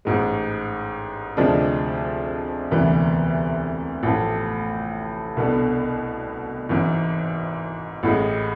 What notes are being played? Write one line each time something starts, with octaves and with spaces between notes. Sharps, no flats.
A1 G#2 G#3
D2 C3 F3 G#3 D4
E1 D2 C3 E3 B3
A1 A2 F3 A3
C2 B2 B3 D4 A4
G#1 G#2 E3
A1 A2 G#3